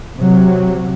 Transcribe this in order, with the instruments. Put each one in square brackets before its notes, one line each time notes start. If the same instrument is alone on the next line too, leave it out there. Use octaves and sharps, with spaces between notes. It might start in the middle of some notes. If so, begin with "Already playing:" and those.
[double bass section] C3 F#3